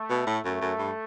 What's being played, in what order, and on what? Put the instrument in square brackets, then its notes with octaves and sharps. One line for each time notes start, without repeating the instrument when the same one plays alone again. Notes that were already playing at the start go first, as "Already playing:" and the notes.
Already playing: [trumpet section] A3
[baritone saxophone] B2
A2
[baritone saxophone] F#2 [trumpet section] A3
[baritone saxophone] F#2
G2